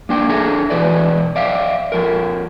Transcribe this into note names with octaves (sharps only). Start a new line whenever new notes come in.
A#3 D4 G5
D4 G#4 A4 E5 A#5
B2 E3 B4 D5
D5 E5 F5
F2 A#4